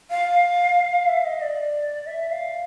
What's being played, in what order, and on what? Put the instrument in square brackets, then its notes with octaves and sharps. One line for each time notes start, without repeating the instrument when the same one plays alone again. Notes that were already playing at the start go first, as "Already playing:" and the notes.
[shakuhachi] F5
E5
D#5
D5
E5
F5